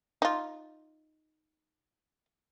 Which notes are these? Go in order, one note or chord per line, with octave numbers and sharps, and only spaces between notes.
D#4 F4